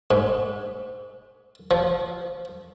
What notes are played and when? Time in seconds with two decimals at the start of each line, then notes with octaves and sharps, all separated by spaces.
0.11 G#2
1.71 F3